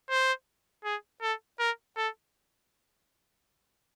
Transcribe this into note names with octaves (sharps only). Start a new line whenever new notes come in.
C5
G#4
A4
A#4
A4